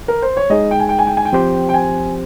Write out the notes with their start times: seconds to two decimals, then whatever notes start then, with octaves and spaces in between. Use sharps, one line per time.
0.08 A#4
0.22 C5
0.37 C#5
0.50 G#3 D#4 G#4 D#5
0.71 G5
0.80 G#5
0.89 G5
0.99 G#5
1.07 G5
1.17 G#5
1.25 G5
1.33 F3 C4 G4 C5
1.69 G5
1.74 G#5